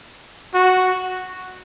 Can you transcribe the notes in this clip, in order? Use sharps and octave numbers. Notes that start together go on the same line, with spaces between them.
F#4